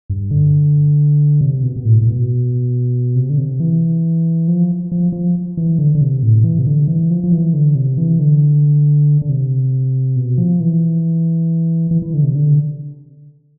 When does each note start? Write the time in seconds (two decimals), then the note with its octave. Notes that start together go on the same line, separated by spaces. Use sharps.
0.10 G2
0.31 D3
1.41 C3
1.63 B2
1.76 B2
1.85 A2
2.01 A2
2.07 B2
3.15 C3
3.30 D3
3.38 C3
3.60 E3
4.48 F3
4.92 F3
5.12 F3
5.57 E3
5.79 D3
5.95 D3
6.01 C3
6.23 A2
6.44 E3
6.59 C3
6.66 D3
6.88 E3
7.10 F3
7.24 F3
7.32 E3
7.53 D3
7.75 C3
7.98 E3
8.19 D3
9.22 D3
9.29 C3
10.16 B2
10.38 F3
10.60 E3
11.91 E3
12.02 E3
12.14 D3
12.23 C3
12.36 D3